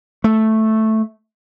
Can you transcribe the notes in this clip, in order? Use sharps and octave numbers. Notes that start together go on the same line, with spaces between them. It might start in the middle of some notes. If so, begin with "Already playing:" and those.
A3